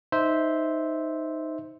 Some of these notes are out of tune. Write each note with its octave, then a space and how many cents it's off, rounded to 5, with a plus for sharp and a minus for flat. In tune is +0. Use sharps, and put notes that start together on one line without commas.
D#4 +0 C5 -5 E5 -10